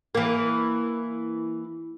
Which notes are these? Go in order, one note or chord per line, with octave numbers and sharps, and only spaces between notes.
E3 A#3